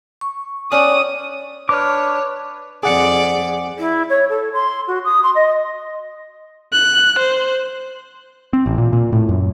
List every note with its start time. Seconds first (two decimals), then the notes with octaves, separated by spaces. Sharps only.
0.21 C#6
0.72 C#4 D4 G4 D5 D#6
1.69 D4 B4 C#5 D6 F6
2.83 F2 G#4 D5 F#5 C#7
3.77 E4
4.10 C#5
4.29 A4
4.53 C6
4.87 F#4
5.05 D#6
5.23 C6
5.35 D#5
6.73 F#6
7.18 C5
8.53 C4
8.66 A1
8.78 A#2
8.93 A#2
9.12 A2
9.29 F#2